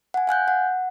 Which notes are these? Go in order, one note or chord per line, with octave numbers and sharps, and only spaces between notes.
F#5 G#5
F5 G#5 F#6 G6
F#5